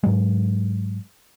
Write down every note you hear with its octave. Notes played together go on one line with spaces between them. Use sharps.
G#2 F#3 G#3